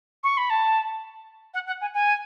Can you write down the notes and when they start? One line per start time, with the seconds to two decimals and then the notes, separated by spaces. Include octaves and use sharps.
0.23 C#6
0.37 B5
0.50 A5
1.54 F#5
1.67 F#5
1.81 G#5
1.94 G#5